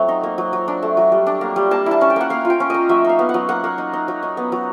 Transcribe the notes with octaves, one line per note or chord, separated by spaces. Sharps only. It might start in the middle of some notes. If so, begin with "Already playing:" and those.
Already playing: F#3 A3 C4
D#4
A#3
F#3
F#3
D4
A3
F#3
G3
D4
A#3
G3
A#3 A5
E4 A5
C#4
G5
A#3 F#5
A#3 F5
F4
G5
C#4
A#3 D#5
F#3 E5
D#4 F5
B3
F#5
F#3
A#3 F#5
A#3
D#4
D#4
F#3
D#4
B3
F#3